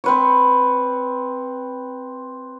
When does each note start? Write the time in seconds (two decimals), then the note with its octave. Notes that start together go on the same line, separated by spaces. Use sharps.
0.04 C4 B4 C#5